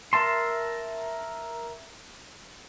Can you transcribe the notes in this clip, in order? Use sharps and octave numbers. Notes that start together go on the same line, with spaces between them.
A#4 E5 A5 C6